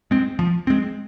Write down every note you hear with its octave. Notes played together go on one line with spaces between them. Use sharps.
G#3 C4
F3
G#3 C4